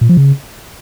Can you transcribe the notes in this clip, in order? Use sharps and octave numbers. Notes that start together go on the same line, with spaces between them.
A#2
F3
C#3